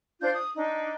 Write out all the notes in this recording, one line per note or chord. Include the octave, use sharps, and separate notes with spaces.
D4 F4 C5 G6
D#6
D4 D#4